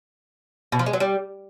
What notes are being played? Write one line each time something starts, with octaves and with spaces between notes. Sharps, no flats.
B2
F3
G#3
F#3
G3